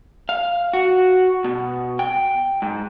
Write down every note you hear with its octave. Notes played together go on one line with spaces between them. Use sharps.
F5
F#4
B2
G5
G#2